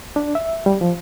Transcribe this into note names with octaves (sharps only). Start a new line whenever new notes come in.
D4
E5
G3
F3